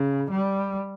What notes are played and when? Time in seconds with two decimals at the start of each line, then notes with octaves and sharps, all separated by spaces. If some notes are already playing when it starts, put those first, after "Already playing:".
Already playing: C#3
0.30 G3